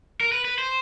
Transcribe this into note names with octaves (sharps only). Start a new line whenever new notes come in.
A#4
B4
B4
C5